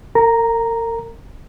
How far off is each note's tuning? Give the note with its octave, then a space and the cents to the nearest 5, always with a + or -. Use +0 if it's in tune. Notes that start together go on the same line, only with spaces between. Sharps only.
A#4 -35 A#5 +0